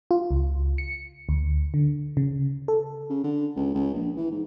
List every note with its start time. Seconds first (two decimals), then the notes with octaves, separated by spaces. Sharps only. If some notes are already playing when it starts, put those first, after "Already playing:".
0.11 F4
0.31 C#2
0.78 C#7
1.29 D2
1.74 D3
2.17 C#3
2.68 A4
3.10 C#3
3.24 D3
3.56 C#2
3.74 C#2
3.94 A#1
4.17 E3
4.31 G#2